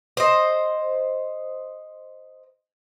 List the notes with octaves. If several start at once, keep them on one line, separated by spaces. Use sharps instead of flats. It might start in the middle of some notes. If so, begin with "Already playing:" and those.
C5 D#5